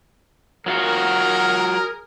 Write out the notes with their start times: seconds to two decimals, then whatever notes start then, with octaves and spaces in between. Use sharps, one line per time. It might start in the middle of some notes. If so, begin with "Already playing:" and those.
0.66 F#3 F4 F#4 G#4 A#4